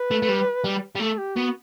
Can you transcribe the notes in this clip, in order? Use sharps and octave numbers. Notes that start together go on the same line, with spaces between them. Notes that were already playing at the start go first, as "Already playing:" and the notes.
Already playing: B4
A3
A3
G3
G3
G3
A3 A4
G4
B3 F#4